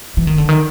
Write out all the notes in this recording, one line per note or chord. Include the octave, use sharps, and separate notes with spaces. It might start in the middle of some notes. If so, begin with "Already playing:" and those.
E3
D#3
D3
D#3